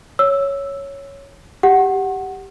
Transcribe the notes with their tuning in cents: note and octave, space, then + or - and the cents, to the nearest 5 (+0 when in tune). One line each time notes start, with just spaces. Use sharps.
C#5 +0 E6 +0
G4 +0 F#5 +10